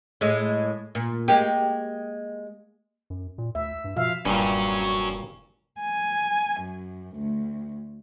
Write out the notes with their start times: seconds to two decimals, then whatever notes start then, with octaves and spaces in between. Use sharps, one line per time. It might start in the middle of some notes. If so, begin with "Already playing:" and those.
0.21 A2 G#3
0.95 A#2
1.28 G#3 A#3 G4
3.10 F#2
3.38 A#2
3.55 D2 E5
3.84 G2
3.96 B2 F3 E5 F5
4.25 F1 G2 A#2 F#3 C#4
5.80 G#5
6.60 F#2
7.16 D2